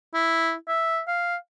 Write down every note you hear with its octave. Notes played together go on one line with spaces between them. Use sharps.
E4
E5
F5